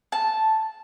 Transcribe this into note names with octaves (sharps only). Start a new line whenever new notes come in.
A5